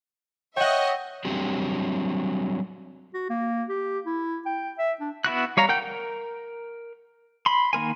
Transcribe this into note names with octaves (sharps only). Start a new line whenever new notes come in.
C#5 D#5 E5 F#5 G5
F#3 G3 C4 D4 F#4 G4
F#4
A#3
G4
E4
G5
E5
D4
B3 E4 F#4 F#6
G3 C#5 F5 A#5
A#4 F#5 G5 G6
A#4
B5 C6
D#3 A#3 A#4 G#5